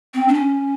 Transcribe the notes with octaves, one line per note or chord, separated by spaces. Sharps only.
C4
D4
C#4